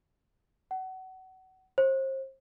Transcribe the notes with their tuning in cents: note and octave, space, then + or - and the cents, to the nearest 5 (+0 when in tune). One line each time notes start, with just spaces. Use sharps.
F#5 +30
C5 +35